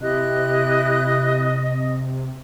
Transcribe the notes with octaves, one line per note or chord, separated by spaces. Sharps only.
C3 E4 G4 D#5 F#6